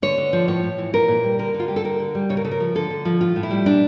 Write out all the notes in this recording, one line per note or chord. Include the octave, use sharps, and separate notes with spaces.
D3 C#5
D3
F3
A2 C#5
A2
E3
A#2 A#4
A#2
G3
D3 A#4
D3
F4
G3 G4
A4
D3 A#4
D3
G3
C#3 C#5
A#4
C#3 A4
A#4
F3
D3 A4
D3
F3
A2 F4
A2
E4
G3
A#2 D4